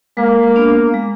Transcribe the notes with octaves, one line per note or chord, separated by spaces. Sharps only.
G#3 A#3
B3 D4
G#3